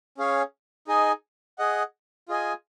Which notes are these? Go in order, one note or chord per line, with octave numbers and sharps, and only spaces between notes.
C#4 G#4 C#5 F5
D#4 G#4 D#5 G#5
G#4 D#5 F#5
F4 G#4 D#5 G#5